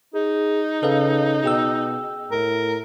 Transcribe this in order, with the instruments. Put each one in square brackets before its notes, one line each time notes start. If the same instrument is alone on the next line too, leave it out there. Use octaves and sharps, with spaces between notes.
[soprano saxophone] D#4 [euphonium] G#4
[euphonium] C#3 [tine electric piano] A4 B4 F5
[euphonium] B2 [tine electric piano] G#4 G5 E6
[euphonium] A2 [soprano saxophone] A#4